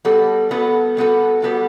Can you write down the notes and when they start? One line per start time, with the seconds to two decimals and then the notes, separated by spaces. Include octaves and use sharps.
0.05 G3 B3 F#4 A4
0.51 G3 B3 F#4 A4
0.97 G3 B3 F#4 A4
1.42 G3 B3 F#4 A4